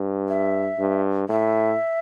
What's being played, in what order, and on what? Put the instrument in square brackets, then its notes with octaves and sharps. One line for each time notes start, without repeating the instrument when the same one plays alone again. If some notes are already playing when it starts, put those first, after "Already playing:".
Already playing: [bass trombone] G2
[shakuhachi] E5
[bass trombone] G2
[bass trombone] A2 [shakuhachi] E5